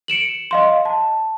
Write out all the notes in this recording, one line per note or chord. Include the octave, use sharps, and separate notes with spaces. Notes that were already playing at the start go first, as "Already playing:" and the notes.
C#7 D7 E7 F#7
D#5 F5 C6
A5